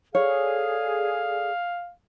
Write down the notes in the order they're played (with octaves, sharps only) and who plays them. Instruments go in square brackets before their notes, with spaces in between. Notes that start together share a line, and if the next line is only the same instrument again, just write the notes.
[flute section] G#4 A4 D5 [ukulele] C#5 [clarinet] F5